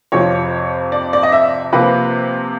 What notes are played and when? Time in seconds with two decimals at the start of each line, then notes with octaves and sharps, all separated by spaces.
0.12 F2 C3 F3 C#5
0.92 D5
1.13 D5
1.23 D#5
1.32 E5
1.73 C3 F3 A#3 B4